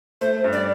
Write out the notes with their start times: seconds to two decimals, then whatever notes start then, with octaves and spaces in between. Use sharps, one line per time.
0.21 A3 C5
0.44 G2
0.53 D5